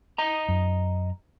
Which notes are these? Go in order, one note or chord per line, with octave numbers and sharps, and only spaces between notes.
D#5 A#5
F#2